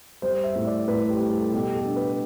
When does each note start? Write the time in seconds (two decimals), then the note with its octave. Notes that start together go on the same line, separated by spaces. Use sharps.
0.22 G3 C5
0.44 E5
0.55 A2
0.67 D5
0.87 A2 B4
1.10 G4
1.20 G3
1.32 A4
1.53 B2 G4
1.74 A4
1.85 D4
1.96 B4